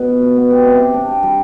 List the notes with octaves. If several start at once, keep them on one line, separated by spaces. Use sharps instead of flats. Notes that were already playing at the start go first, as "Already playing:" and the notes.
Already playing: B2 B3 B4
F4
F4
B3
G4
C3
G4
D4
G4
G3